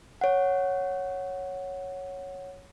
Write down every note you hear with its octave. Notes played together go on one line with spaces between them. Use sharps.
C#5 F#5